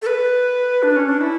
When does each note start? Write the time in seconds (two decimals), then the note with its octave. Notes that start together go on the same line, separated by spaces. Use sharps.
0.02 A4
0.07 B4
0.83 D4
0.96 C#4
1.09 D4
1.21 E4